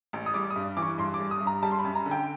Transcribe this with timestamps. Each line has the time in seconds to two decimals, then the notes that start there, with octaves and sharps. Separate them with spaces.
0.13 A1
0.26 D#6
0.34 G3 D6
0.50 D#6
0.56 G2
0.77 E3 D6
0.82 C#6
0.98 G2 C6
1.14 D6
1.20 G3
1.31 D#6
1.41 G2
1.47 A#5
1.63 G3 A5
1.71 C6
1.79 B5
1.84 F#2
1.95 A#5
2.06 D3
2.11 G5